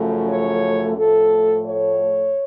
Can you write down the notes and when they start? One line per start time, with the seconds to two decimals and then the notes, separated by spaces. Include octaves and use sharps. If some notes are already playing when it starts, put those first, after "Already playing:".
Already playing: F#2 C#3 F3 A3
0.28 C#5
0.96 A2 F3 A3 A4
1.66 C#5